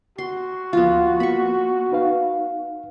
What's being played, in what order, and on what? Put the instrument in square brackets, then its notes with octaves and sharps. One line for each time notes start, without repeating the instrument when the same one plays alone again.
[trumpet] F#4 [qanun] C6
[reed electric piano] D2 F3 F5 [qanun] B3 F4
[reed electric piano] A#3 B3 [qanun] B5 C#6
[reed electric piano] D#4 B4 F5